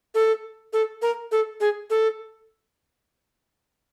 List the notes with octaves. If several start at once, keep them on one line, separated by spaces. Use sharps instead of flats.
A4
A4
A#4
A4
G#4
A4